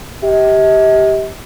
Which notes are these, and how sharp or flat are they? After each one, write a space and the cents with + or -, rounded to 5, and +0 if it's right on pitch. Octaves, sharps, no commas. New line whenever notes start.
G4 -5 D#5 +45